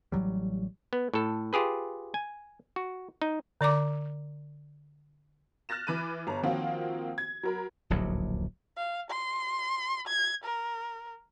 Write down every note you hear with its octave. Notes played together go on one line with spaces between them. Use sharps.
A1 B2 F#3 G3
B3
A2 A4
F4 G4 G#4 B4
G#5
F#4
D#4
D3 D5 A#5 D6
F6 F#6 A6 A#6 E7
E3 B5 D6 F#6 D#7
G1 A#5
D#3 F3 A#3 C4 F4 F#4
G#6
F#3 A#4 B5
D1 A#1 D#2 F#3
F5
C6
G#6
A#4